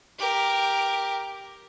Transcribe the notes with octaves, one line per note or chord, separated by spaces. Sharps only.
G4 A#4